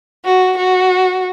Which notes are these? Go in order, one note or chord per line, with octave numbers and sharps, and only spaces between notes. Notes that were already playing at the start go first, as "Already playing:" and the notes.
F#4
F#4